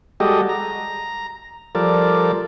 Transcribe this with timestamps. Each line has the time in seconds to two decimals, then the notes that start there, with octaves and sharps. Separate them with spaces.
0.20 G3 G#3 F#4 G4 A4 D#5
0.49 A#5
1.75 F3 G3 A4 A#4 D5